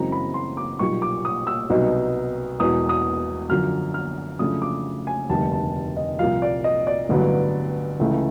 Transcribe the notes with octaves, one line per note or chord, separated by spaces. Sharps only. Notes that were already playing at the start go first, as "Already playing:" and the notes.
Already playing: F#2 C#3 E3 G#3 C4 A#5
B5
C6
D6
B1 A#2 G3 C#6
D6
D#6
E6
C2 B2 F#3 B3 D#4
E1 E2 B2 D#6
D#6
F#2 D3 F3 F6
F6
F2 C#3 F#3 A3 D4 D#6
D6
G#5
F1 D#2 D3 G3 A5
A5
D#5
C2 A#2 F3 F5
D5
D#5
D5
A1 G2 D3 F#3 B3
C#2 C#3 E3 A3